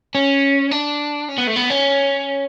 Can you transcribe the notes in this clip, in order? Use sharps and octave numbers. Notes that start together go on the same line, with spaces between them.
C#4
D4
C#4
B3
A3
B3
C#4